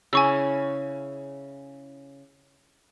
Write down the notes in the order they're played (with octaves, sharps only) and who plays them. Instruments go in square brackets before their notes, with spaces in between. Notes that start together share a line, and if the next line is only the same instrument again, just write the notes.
[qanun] C#3 E4 [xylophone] G#5 C#6 E6